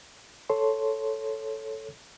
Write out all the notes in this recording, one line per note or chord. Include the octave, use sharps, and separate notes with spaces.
A4 C#5 C6